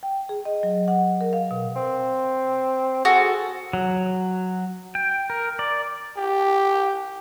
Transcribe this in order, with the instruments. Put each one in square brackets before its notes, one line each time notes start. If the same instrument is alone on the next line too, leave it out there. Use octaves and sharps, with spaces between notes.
[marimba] G5
G#4
D#5
F#3
F#5
A#4
F5
B2
[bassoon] C4
[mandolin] F#4 A4 [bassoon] G#4
[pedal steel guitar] F#3
G5
A#4
D5
[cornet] G4